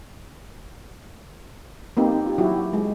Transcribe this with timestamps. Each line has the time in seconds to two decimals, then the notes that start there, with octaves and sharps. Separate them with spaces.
1.97 A#3 C4 D#4 G4 B4
2.26 F4 G4
2.38 F#3 E4 F#4 G4
2.73 G#3